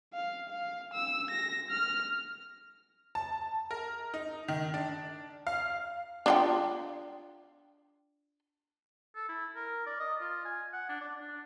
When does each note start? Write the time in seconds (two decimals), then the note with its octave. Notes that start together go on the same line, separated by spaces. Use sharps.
0.13 F5
0.49 F5
0.93 E6
1.30 A#6
1.70 F6
3.15 A5
3.71 A#4
4.14 D#4
4.48 D#3
4.74 D4
5.47 F5
6.26 D4 F4 G5
9.15 A4
9.29 E4
9.55 A#4
9.86 D5
10.00 D#5
10.21 F4
10.45 G#5
10.73 F#5
10.89 D4
11.01 D5
11.21 D4